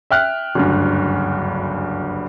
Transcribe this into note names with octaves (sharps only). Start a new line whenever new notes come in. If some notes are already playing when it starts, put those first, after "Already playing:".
E5 G5 F6 F#6
F#1 D2 G2